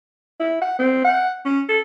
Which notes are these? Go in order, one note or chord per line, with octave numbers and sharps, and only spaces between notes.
E4
F#5
C4
F#5
C#4
A4